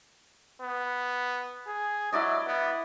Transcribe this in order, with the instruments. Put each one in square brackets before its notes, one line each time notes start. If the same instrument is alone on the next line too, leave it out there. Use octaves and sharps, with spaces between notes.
[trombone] B3
G#4
[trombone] F#3 [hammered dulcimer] E4 D5 D#5
[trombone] B3